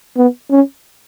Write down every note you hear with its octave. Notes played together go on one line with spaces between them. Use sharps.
B3
C#4